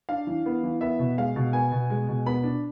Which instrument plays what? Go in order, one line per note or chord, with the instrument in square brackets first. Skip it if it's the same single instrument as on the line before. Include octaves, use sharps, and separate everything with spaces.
[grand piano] D4 F5
E3
B3
E3
B3 E5
B2
G#3 F5
B2
B3 G#5
B2
G#3
B2
B3 B5
D4